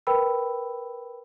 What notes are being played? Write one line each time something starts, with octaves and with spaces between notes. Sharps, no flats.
A#4 B4 G5 B5 E6